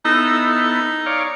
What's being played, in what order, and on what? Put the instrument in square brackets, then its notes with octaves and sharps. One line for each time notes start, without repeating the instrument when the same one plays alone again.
[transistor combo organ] B3 E4 A4 [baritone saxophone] D#4
[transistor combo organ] C#5 D5 F5